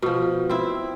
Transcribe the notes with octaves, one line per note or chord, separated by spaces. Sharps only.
B2 F3
C4 E4